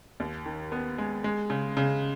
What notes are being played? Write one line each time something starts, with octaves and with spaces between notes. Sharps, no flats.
D#2
D#3
B3
G#3
G#3
C#3
C#3